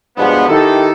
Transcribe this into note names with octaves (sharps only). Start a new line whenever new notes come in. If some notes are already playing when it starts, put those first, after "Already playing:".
G2 B2 F3 G#3 B3
D#3 D#4 E4 G4 A4